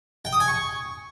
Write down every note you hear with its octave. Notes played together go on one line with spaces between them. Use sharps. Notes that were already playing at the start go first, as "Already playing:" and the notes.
G5
D#6
G#5
C#6